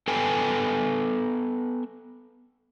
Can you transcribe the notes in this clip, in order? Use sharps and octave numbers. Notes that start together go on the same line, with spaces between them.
B3 A4 B4 G5 G#5